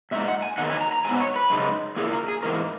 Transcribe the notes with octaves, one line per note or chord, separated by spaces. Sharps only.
A#2 G#3 D#4 E5
F#5
G#5
E2 D#3 F#3 A#3 F#5
G#5
A#5
A#5
G#2 F#3 B3 G#5
C#5
B4
F#2 C#3 G#3 D#4
A#2 A#3 E4 G#4
A#4
G#4
G#2 E3 A#3 A#4